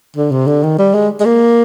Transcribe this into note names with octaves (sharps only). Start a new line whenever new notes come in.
D3
C3
D3
D#3
G3
G#3
G#3
A#3